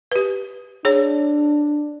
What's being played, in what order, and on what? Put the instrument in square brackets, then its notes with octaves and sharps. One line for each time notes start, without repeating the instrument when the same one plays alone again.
[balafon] G4 B4
[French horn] D4 [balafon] G#4 C#5